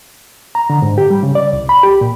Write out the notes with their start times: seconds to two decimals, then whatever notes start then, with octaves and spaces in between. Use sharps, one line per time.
0.55 A#5
0.70 D3
0.82 G#2
0.98 G4
1.10 G3
1.23 C#3
1.35 D5
1.53 C2
1.69 B5
1.83 G4
2.01 A#2